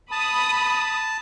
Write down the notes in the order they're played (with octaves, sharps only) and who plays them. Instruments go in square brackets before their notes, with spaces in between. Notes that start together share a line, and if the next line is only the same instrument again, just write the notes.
[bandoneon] A5 [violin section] B5 D#6